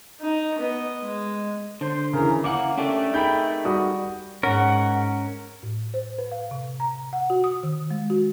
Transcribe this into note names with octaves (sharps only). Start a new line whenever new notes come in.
D#4
B3 D#5
G#3
D3 C5
C#3 E3 A#4
C#3 A#3 E4 F#5 D6
A3 C#4 D4 G4
D#4 G#4 A#4 G5 B5 G6
G3 F#4 D#6
G#2 C#4 A#4 F#5
A2
C5
B4
F5
C3
A#5
F#5
F#4
D#6
D#3
G#3
F#4